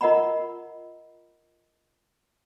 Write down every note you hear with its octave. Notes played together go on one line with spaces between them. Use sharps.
F4 A#4 D#5 F#5 A#5 B5